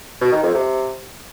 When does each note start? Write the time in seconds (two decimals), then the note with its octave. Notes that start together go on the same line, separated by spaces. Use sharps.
0.21 B2
0.32 D#3
0.43 F2
0.54 C3